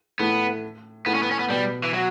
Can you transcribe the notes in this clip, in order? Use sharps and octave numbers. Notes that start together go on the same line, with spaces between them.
A2 A3 B3
A2 A3 B3
C#4
B3
C#4
B3
B2 G3 B3
E3
F#3